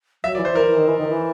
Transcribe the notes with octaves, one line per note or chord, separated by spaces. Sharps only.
F#3 E5
D5
E3
C5
E3 A#4
E3
D#3
E3
D#3
E3